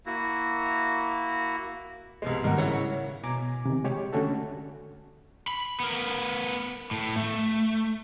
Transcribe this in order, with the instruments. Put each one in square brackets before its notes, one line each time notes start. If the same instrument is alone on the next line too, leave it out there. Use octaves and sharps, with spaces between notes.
[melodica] A#3 E4 F#4
[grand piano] C2 B2 G#3
[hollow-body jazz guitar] G#2 D#3 G3 [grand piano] A#4 F#5
[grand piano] C#3 E4 [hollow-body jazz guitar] C#5 F#5
[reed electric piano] B2 G#5 A#5 D6
C3 D#3
G#3 G4 C#5
D3 A3 C#4 F#4 A4
[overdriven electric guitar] B5
B3 A#4
A2
A3